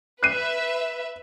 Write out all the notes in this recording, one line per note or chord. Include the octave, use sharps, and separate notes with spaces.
B4 E5 F#6 C7 D#7